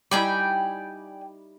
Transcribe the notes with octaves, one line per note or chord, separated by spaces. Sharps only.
G3 D#4 E4 D5 G5 G#5